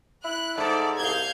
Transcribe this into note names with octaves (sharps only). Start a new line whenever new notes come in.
E4 F#6
G#2 A3 A4 D5
C2 F5 G6 G#6